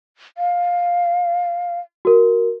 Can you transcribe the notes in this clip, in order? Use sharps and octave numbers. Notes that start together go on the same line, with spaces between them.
F5
F#4 A#4